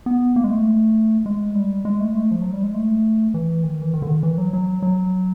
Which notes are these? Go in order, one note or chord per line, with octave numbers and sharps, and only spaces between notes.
B3
A#3
G#3
A3
G#3
G3
G#3
A3
G#3
A3
F3
F#3
G3
G#3
A3
E3
D#3
E3
D#3
D3
D#3
E3
F#3
F#3
F#3